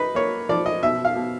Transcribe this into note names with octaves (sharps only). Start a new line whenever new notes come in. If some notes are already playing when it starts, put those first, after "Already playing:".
Already playing: D#4 B4
A#3 C#5
F3 D5
D#5
B2 E5
F5
B2